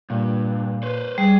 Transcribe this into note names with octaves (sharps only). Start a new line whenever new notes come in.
G2 A#2
B4 C5
G3 G#4